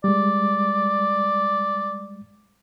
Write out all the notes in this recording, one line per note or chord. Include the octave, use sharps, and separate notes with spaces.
G3 G#3 D5